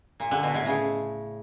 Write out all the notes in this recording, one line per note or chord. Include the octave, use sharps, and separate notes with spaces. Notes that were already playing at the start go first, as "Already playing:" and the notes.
A#2
D3
B2
A2
C#3